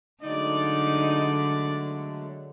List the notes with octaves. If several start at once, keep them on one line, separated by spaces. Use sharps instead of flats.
D3 F#3 G#3 A3 D#4 D5